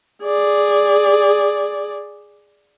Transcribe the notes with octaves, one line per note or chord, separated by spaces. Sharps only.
G#4 D5